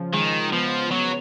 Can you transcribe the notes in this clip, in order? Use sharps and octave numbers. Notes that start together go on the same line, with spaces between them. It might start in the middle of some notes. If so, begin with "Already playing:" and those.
Already playing: C#3 F3
D#3 G#3
F3 B3
F#3 B3